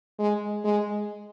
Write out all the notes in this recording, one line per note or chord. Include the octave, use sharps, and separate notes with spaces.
G#3
G#3